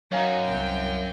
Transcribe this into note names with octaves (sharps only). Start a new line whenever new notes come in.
F#2 D#4 F#4 C#5 F5 G#5
C2 C3 G5